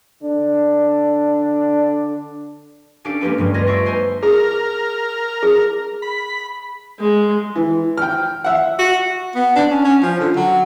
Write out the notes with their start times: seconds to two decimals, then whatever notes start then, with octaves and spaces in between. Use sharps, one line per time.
0.22 D3 D4
3.04 C#4 D4 G4 A4 F5 D7
3.21 G#3 A#3 C#4 G4 B4
3.38 G2 F#3 G#3
3.54 D2 F4 B4 D#5 G#6 A#6
3.67 D#5 E5 C#6 E6 C7 D7
3.85 B4 C5 G#5 A#5
4.23 G#4 A#4
5.43 G#4
6.02 B5
6.99 G#3
7.55 E3
7.98 G5 F6
8.44 E5 F#5
8.79 F#4
9.35 B3
9.56 D4
9.70 C#4
9.85 C#4
10.03 F3
10.20 D3
10.36 F#3